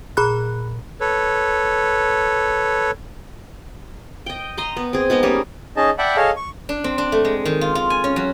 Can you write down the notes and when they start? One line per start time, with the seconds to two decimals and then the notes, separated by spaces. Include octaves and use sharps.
0.17 A#2 G#4 A#5 B5 F#6
1.01 A4 B4 C#5
4.26 D#5 G5
4.57 D#5 A#5 C6
4.77 B3
4.93 C4 G#4
5.10 G#3 B3 D#4 D#5
5.23 G3 A#3 C#4 G#4
5.76 C#4 D#4 G#4 D#5 A5
5.98 D5 E5 F#5 G5 A5 B5
6.16 G#4 A4 C#5 D#5 F5
6.37 C#6
6.69 D4
6.84 C4
6.98 D4
7.12 A3
7.25 G#3
7.45 D#3
7.61 F4
7.75 F4
7.90 G#5
8.04 C#4
8.16 F#3